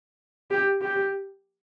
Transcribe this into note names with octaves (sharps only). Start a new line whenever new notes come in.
G4
G4